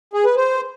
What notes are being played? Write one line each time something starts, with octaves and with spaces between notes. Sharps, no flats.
G#4
B4
C5